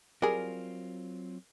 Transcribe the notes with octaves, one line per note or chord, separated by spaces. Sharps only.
F#3 G3 C4 F4 G#4 A#4